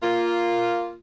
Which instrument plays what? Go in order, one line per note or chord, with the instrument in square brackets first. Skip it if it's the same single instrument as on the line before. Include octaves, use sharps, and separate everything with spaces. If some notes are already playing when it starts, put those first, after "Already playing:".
[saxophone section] A#3 F4